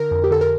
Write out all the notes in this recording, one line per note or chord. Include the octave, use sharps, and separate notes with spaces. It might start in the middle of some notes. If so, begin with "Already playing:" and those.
Already playing: D3 A#4
F2
G4
D3 A4
A#4